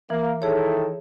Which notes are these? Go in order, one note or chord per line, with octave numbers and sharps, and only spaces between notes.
E3 A#3
D#3 E4 G#4 A4 C#5